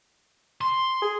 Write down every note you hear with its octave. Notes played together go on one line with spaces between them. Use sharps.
C6
G#4